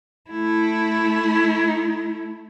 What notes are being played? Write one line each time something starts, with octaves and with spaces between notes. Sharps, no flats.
A3 E4